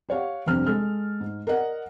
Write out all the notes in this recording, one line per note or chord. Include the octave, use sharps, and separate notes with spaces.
G4 C#5 F5 F#5
F1 G2 C3 C5 F6
G#3 A4 F6
G#2
A#4 D5 D#5 F#5